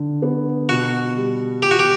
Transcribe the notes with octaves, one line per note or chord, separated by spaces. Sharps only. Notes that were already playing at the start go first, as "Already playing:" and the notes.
Already playing: D3
B3
B2 F#4
G3
B2 G4
F#4
G4